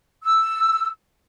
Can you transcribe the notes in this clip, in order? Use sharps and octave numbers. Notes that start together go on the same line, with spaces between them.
E6